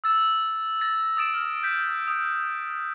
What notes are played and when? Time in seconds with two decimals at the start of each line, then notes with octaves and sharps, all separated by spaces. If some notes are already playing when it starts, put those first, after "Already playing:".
0.04 E6 A6 E7
0.81 A6 A#6
1.17 D#6 A6 D7 E7
1.34 F6
1.63 G6 B6 E7
2.07 D#6